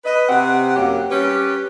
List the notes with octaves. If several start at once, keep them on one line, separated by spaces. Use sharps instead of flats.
B4 D#5
C3 C4 F#5
F#2 F#3 A#3 G4
G3 C#4 G4 B4